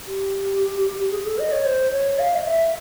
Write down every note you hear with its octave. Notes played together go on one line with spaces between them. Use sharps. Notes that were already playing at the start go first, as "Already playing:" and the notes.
G4
G#4
A4
D#5
C#5
C5
C#5
F5
D#5
E5